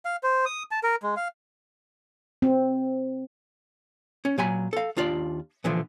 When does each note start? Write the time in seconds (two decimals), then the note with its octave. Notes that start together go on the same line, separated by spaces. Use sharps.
0.05 F5
0.23 C5
0.46 D#6
0.71 A5
0.83 A#4
1.03 G#3
1.16 F5
2.42 C4
4.25 C#4
4.38 A#2 F#3 G#5 B5
4.73 A4 F5
4.97 D#2 D4 F4 D5
5.64 A#2 D3 E3 F3